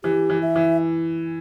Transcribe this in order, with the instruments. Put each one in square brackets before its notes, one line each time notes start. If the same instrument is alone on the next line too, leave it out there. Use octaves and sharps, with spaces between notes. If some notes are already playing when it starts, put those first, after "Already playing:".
[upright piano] E3 [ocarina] G4
[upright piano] E3
[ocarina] E5
[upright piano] E3